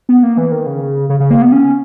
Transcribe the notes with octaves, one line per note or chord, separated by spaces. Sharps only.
B3
A#3
E3
D#3
C#3
C#3
C#3
A#3
B3
C#4